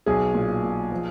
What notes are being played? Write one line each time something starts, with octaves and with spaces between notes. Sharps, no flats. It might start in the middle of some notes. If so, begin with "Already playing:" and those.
B1 G#4
A#2
A#2
F3